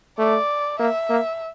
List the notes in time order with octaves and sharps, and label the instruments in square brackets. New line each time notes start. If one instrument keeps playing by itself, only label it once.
[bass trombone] A3 [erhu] D5
[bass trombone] A#3 [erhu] E5
[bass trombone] A#3